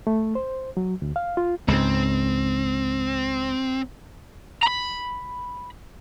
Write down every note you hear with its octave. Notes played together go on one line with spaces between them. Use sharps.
A3
C5
F#3
D2
F5
F4
C#2 G#2 C4
A#5 B5